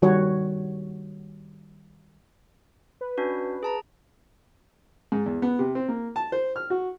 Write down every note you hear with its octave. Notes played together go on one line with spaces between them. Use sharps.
D#3 G3 F#4 C#5
B4
C#4 D4 F#4
G#4 A5 A#5
G#2
E2
B3
C3
C4
A#3
A5
C5
F6
F#4